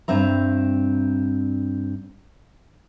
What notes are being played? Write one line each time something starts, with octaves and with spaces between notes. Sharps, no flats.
G2 C4 E5 A#5